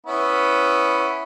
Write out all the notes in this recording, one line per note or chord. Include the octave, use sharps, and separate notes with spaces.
B3 C#4 E4